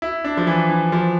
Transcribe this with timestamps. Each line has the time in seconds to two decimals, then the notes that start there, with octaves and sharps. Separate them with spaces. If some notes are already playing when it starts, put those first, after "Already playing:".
0.02 E4
0.24 D4
0.37 F3
0.47 E3
0.70 E3
0.92 F3